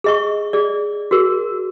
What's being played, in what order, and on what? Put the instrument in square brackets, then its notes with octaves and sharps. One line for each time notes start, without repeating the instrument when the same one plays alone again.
[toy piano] G#4 D#5 C#6
G#4 D5
F#4 G#4 A#4